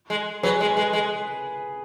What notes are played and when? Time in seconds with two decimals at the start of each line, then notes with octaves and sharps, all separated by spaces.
0.10 G#3
0.43 F#3 G#4 B4
0.60 G#3
0.77 G#3
0.93 G#3